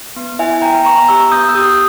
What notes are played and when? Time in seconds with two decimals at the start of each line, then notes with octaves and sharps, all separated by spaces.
0.16 B3
0.39 E4 E5 G#5
0.54 G#5
0.62 B3 G5 A#5
0.85 B3 A#5 C#6
1.09 G4 C#6 E6
1.32 B3 D#6 G6
1.49 E6
1.55 G4 D#6 G6